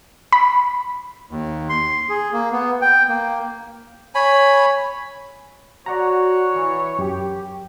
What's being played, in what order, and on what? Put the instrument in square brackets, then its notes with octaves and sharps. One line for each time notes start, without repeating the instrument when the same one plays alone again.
[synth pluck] B5
[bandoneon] D#2
C6
G#4
A#3
B3
G5
A#3
[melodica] C#5 G#5 B5
[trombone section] F#4 [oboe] C#5 [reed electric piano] D5 F#5 A#5
[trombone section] E3
[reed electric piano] F#2 [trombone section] G4